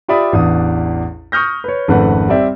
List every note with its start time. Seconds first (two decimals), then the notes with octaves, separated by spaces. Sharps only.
0.08 F4 G4 D5 E5 B5 D#6
0.33 A1 E2 D4 D#6
1.32 C#6 D#6 F6 G6 A#6
1.64 B4 C#5
1.88 G#1 F2 C#3 A3 B4 F#5
2.29 G3 C4 D5 E5 G5